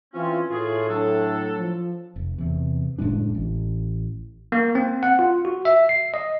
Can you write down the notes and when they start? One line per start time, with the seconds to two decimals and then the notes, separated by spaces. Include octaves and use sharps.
0.14 E3 C4 C#4 F4
0.51 A2 F4 F#4 G#4
0.88 F#3 D4 A4
1.58 F3
2.16 F1
2.38 E2 C3
2.98 F#1 A2 G#3 D4
3.35 A1
4.52 A#3
4.75 C4
5.03 F#5
5.19 F4
5.45 F#4
5.65 E5
5.89 C7
6.14 D#5